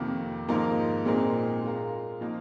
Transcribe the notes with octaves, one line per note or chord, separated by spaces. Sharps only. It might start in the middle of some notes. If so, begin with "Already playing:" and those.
Already playing: F2 C3 D#3 A#3
G#2 F3 A#3 D#4 A#4
A#2 G#3 C4 D#4 A#4
G#3 F4 A#4
F3 A#3 D#4